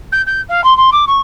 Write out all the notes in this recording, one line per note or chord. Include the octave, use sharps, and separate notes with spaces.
G6
G6
F5
C6
C6
D6
C#6